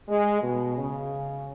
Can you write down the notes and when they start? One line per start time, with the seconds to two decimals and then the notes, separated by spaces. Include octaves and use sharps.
0.08 G#3
0.42 B2
0.77 C#3